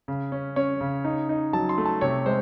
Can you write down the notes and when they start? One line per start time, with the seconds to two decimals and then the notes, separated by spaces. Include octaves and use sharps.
0.08 C#3
0.32 C#4
0.56 C#4 C#5
0.81 C#3
1.04 D#4
1.29 D#4
1.53 F#3 A5
1.69 C6
1.78 A3
1.86 A5
2.01 C3 C#5
2.26 G#3 C5